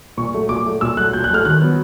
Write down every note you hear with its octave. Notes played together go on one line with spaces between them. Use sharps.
A#2 C#6
F#3 A3
A#2 D6
F#3 A3
A#2 E6
F#3 A3 F#6
A#2 G6
F#6
F#3 A3 F6
D#3 F#6
F#3 B3